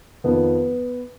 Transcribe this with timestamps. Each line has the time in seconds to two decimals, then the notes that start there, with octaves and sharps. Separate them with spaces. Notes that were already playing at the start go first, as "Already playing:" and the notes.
0.24 F2 D#3 B3